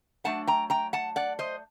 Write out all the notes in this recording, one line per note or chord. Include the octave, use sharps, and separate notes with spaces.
F#3 A3 D4 F#5 A5
G5 A#5
G5 A#5
F#5 A5
D5 F#5
C5 D#5